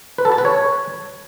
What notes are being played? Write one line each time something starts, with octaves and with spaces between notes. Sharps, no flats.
B4
A4
A5
B4
C#5